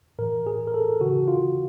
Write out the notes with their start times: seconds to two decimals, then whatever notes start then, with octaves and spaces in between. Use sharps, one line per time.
0.19 A2 E3 A#4
0.47 G#4
0.67 A#4
0.74 A4
1.01 C#3 E3 F#4
1.28 F4